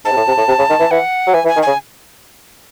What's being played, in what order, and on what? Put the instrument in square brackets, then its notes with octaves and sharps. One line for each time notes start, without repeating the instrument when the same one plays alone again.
[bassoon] G#2 [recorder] A5
[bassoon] C3
A2
C3
A2
C3
C#3
D#3
E3
[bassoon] E3 [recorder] F#5
[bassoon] F#3
[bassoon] E3 [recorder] G#5
[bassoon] E3
[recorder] G#5
[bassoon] D#3
[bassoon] C#3 [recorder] G#5